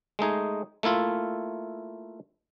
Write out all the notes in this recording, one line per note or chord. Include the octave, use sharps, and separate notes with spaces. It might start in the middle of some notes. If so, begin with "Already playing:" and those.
G#3 A3 D#4 G#4
A3 A#3 E4 F4